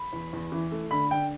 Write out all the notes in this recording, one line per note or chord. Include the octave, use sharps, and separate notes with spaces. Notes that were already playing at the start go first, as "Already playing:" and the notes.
Already playing: B5
E2
E2
E3
A3
D3 B5
D3 G5